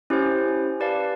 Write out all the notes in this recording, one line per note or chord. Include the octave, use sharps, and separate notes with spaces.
C#4 E4 G4 C5
G4 B4 D5 F5 A5